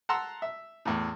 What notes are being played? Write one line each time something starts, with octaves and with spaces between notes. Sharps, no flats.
F#5 A5 A#5 C6 E6
E5
E2 A2